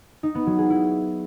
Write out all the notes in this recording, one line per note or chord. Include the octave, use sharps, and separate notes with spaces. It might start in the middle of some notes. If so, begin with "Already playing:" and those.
D#4
B3
F#3
G#4
E4